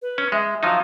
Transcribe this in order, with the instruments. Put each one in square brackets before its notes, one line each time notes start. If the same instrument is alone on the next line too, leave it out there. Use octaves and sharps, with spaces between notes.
[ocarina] B4
[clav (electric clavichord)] C#4
[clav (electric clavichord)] G#3 [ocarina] E5
[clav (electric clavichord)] F3 F#3 D#4 [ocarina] F5